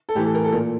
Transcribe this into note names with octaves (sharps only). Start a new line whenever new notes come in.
A4
A2 E3 G4
A4
A#4
A4
A#2 A#4